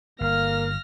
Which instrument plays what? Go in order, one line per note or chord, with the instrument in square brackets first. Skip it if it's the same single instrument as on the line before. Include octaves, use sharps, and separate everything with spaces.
[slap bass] G1 [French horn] A#3 [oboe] F5 [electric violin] F6 A#6